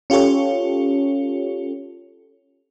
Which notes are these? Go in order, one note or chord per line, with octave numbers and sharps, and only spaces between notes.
C#4 F4 G4 A4 C#5